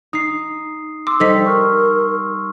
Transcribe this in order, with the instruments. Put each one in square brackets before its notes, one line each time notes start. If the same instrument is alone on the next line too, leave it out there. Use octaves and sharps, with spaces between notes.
[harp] D#4 [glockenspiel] D#6 C7
[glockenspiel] C6 E6 [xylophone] D6
[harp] G3 D#4 [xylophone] A4 D#5 B6 [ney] C5
[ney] A#4 [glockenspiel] C#6 F6